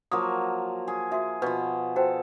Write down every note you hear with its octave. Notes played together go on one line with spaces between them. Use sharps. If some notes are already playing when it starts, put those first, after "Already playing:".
F3 F#3 A#3 D#6
G#4
F#4 G#4 E5
B2 F3 B4
F#4 A4 C5 G5